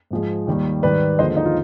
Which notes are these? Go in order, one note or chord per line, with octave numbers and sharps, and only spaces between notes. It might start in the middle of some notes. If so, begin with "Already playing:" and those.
G#2 F3 G#3
D#2 D#3 G3
G#2 D#3 G3 B4 D5
D#2 D3 F3 G#3 C5 D#5
D#4
F4